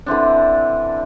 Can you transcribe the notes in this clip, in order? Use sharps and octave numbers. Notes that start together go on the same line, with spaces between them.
D3 E3 C4 D4